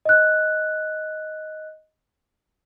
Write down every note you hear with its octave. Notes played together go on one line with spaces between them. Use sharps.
D#5 F#6